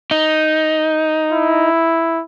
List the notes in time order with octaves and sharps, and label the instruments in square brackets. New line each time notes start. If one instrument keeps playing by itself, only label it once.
[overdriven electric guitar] D#4
[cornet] E4